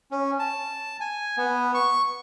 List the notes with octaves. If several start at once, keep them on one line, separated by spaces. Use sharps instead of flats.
C#4
A5
G#5
B3
C#6